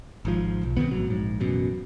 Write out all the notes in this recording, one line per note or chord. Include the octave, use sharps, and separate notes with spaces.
G#1 G#2 F3
B1
C3 D#3 E3 B3
A#1 A2 F#3
A#1 G#2
A1 F#2 B2